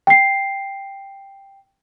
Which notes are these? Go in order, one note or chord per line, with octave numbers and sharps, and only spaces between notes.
G5 C7